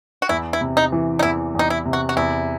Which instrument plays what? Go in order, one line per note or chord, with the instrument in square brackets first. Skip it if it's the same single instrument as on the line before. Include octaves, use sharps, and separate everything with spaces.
[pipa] F#4
[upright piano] E2 [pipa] E4
[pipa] E4
[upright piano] C3
[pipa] D#4
[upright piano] E3
[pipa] D#4
[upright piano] E2 [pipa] E4
[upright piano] E2 [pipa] D#4
[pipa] E4
[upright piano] C3
[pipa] F#4
F#4
[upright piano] E2 [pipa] E4